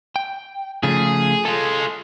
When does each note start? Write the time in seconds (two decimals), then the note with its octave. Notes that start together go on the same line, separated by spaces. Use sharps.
0.16 G5
0.83 C#3 F3 A3 G#4
1.45 G#3 F4 A4